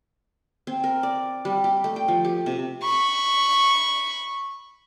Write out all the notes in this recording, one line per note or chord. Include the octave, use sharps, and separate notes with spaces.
C4
A#4
D5
G3
G4
A3
G5
F3
G4
C3
B5 C#6